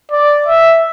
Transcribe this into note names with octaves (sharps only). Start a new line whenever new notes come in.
D5
E5